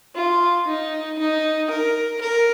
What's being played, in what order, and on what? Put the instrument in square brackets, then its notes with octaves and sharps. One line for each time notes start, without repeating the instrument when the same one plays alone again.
[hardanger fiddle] F4
D#4
D#4
A#4
A#4